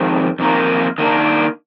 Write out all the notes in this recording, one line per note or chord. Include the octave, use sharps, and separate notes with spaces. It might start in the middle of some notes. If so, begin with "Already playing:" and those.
Already playing: F2 D#3 G#3
F2 D#3 A#3 D#4
D#3 A#3 D4